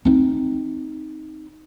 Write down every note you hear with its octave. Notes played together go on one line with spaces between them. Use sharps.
C4 D#4